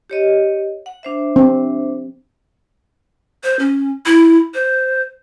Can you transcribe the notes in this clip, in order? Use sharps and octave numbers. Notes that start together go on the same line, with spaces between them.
G4 C#5 D#5
F#5
D4 C5 E5
C4
C5
C#4
E4
C5